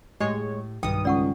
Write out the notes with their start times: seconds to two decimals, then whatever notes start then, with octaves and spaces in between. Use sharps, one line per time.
0.20 A2 G#3 G4 C#5
0.83 B1 G2 D#3 G5 D#6
1.05 C#2 D5 F#5 C#6